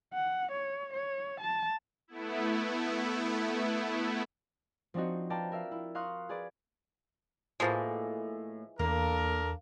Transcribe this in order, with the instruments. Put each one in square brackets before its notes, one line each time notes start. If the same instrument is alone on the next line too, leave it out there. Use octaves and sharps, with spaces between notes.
[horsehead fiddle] F#5
C#5
C#5
A5
[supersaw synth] A3 B3 E4
[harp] F3 C4 D4 D#4 F#4
B4 D5 F5 G5 A5 A#5
A#4 E5 F5
E4
F5 A#5 C6 C#6 D#6 F#6
G#4 B4 D5
[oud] A2 A#3 F#4 [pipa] E3 F3 G#3
[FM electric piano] E2 [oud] A#3 [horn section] D4 A4 A#4